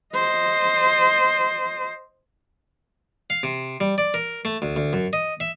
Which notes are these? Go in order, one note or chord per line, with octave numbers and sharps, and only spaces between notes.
C5 D#5
F5
C3
G3
D5
A#4
A3
D2
D2
F#2
D#5
E5